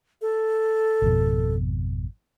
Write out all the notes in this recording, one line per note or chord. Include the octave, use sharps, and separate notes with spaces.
A4
G#1 F2 B2